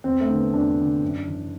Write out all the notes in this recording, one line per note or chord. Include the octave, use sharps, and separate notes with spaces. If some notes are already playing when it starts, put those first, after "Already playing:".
E2 C4
A3
D3
B3
E2 D4
D3
F#2
E3